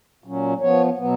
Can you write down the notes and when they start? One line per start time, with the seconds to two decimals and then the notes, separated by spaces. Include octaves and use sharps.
0.24 A#2 F#3 C#4
0.61 F3 B3 C#5
0.97 B2 F#3 B3